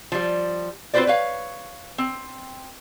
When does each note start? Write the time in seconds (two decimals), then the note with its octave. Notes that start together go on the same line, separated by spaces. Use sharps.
0.12 F3 G3
0.94 C4 F4 F#4 B4 C5 D5
1.07 B4 C#5 F5
1.98 C4